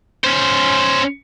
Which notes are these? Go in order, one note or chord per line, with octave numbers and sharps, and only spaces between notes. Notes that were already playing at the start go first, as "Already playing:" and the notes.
C#4 C5